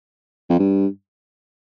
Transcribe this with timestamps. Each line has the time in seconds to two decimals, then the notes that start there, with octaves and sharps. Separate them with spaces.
0.50 F2
0.60 G2